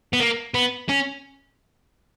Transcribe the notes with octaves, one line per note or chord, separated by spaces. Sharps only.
B3
A#3
B3
C#4